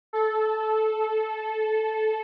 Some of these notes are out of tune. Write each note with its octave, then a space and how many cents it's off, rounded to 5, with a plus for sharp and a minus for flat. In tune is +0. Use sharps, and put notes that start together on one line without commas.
A4 -15